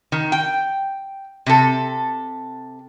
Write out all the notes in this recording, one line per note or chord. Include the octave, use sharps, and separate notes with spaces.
D#3
G5
C3 A4